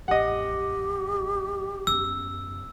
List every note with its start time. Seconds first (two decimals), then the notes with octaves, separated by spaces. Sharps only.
0.08 A1 F2 G4 D#5 F#5
1.87 F#2 B3 E6